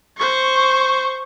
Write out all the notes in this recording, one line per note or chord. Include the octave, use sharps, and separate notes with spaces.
C5 C#6